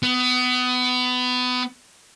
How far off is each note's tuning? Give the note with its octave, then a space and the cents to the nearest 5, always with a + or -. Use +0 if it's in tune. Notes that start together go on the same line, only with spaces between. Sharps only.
B3 +25